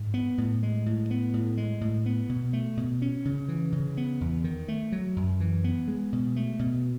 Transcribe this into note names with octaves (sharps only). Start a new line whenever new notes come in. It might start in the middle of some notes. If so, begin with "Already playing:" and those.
Already playing: G#2
B3
A2
G#3
A2
B3
A2
G#3
A2
B3
B2
A3
B2
C#4
C#3
E3
C#3
B3
E2
D#3
A3
F#3
F#2
E3
B3
G#3
B2
A3
B2